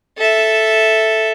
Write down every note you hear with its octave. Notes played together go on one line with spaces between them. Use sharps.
A4 E5